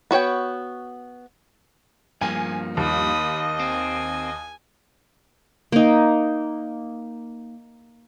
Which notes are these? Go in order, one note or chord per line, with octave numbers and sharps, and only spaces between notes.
B3 F#4 C#5 G5
G2 F3 A#3 G#5
D#2 D#5 B5 D#6
C4 G#5
A#3 D#4